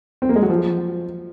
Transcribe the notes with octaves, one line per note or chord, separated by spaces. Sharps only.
C4
A#3
G#3
F#3
F3